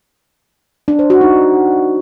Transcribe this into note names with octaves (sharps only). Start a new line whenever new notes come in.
D4
C5
F#4
D#4